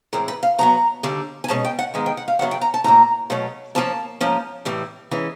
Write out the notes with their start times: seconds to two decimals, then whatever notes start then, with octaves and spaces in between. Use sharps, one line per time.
0.13 A2 E3 G#3 C4 A#4
0.28 B4
0.43 F5
0.58 B2 F#3 B3 A#5
1.03 D#2 D3 G3
1.44 G#5
1.48 B2 G#3 C#4 A5
1.65 G5
1.79 F#5
1.94 G#2 D#3 G#3 B3 G#5
2.06 G5
2.17 F#5
2.28 F5
2.39 F#2 C#3 F#3 B3 F#5
2.51 G5
2.61 A#5
2.74 A5
2.84 A2 F#3 A#3 A#5
3.30 B2 F#3 A3 C#4
3.75 A2 F3 A#3 C#4 A5
4.21 G#2 F3 A#3 C#4
4.65 A2 E3 G3
5.11 E3 G#3 C#4